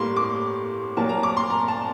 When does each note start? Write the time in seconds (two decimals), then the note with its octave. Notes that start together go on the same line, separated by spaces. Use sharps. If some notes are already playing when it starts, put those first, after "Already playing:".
Already playing: A2 G3 A#3 C6
0.17 D6
0.97 A#2 F#3 A#3 A5
1.09 A#5
1.23 D6
1.37 C6
1.50 A#5
1.68 A5